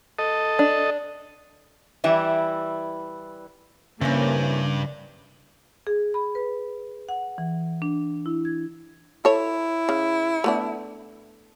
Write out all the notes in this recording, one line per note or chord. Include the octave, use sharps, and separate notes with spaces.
A4 D#5
D4
E3 G3 E4
G2 C#3 E3 A#3 C4 C#4
G#4
B5
B4
F#5
E3
D4
E4
G#6
E4 A4 C#5
C#3
A3 B3 D4